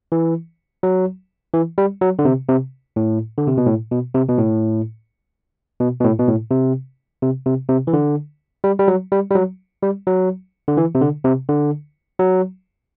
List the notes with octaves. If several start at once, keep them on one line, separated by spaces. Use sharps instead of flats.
E3
F#3
E3
G3
F#3
D3
C3
C3
A2
D3
C3
B2
A2
B2
C3
B2
A2
B2
B2
A2
B2
A2
C3
C3
C3
C3
E3
D3
G3
G3
F#3
G3
G3
F#3
G3
F#3
D3
E3
C3
D3
C3
D3
F#3